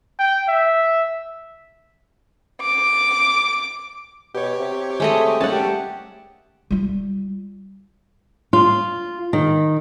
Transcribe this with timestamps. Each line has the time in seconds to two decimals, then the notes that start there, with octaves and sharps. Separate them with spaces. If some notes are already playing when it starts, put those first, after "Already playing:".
0.19 G5
0.48 E5
2.62 D6
4.35 B2 G4 C#5
4.60 C3
5.00 G#3 A3 D#5
5.41 D#2 G3 A3 C#4 F#5 A5
5.52 G4
6.71 G3 F4
8.53 F4
9.33 D#3